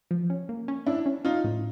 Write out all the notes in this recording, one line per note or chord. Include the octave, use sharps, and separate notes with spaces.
F3
C#4
A#3
C#4
C#4 D4 E4
C#4
C#4 D#4 F4
A2